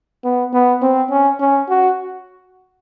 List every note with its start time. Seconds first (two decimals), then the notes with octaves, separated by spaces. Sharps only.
0.24 B3
0.53 B3
0.82 C4
1.11 C#4
1.40 C#4
1.69 F#4